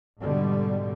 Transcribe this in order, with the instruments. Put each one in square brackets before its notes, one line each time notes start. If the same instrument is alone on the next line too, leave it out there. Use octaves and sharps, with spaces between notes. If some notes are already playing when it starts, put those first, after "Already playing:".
[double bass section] G#2 B2 D3 G3